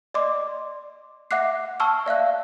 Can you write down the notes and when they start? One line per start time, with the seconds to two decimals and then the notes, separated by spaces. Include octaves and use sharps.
0.14 D5 D#5 C6 D6
1.31 E5 F#5 D6 F#6 C7
1.80 A5 C#6 E6 F6
2.06 D5 E5 F5 F#6